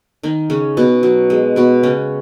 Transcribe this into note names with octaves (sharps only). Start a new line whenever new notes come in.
D#3 D#4
C#3 C#4
B2 B3
F#3
G#3
B2 B3
C#3 C#4